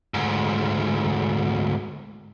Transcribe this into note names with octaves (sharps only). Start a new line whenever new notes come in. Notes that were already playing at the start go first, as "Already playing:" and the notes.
D2 G#2